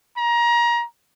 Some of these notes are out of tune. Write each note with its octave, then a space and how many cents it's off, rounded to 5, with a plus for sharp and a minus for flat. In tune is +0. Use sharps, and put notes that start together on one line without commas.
A#5 +25